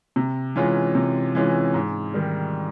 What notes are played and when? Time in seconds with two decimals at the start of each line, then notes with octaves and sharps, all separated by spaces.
0.16 C3
0.56 E3 G#3 C#4 F4
0.95 C3
1.35 E3 G#3 C#4 F4
1.74 G#2
2.14 D#3 G3